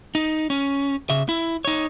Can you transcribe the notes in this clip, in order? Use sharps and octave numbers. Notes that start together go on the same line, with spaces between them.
D#4
C#4
C#3 E5
E4
D#4 C#5